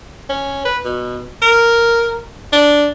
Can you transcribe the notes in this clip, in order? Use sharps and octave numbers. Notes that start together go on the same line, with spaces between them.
C#4
B4
B2
A#4
D4